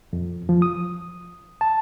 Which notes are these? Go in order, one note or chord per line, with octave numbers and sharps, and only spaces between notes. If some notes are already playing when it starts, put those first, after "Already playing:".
F2
F3
D#6
A5